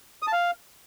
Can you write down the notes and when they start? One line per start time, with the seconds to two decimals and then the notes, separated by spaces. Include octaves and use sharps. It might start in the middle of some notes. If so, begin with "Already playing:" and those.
0.22 D#6
0.27 A5
0.32 F5